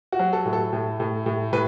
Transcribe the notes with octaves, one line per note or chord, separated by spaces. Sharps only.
F#4
F#3
A4
A2
A4
A2
A2
A2
A2 B4